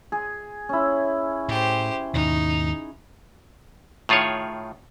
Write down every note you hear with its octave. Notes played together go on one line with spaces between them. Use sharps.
G#4
C#4 E4
A2 G4 C5
D#2 G#2 B2 D#4
A2 D#3 F4 G#4 C#5